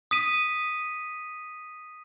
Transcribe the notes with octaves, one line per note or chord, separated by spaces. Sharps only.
D#6 B6 D#7